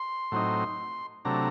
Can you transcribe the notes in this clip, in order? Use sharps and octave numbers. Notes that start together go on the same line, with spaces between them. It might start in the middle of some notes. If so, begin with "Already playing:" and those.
Already playing: C6
A2 F#3 C4 D#4
C3 F#3 A3 D4 A#5